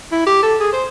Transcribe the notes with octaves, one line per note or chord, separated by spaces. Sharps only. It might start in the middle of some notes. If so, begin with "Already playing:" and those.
E4
G4
A4
G#4
C5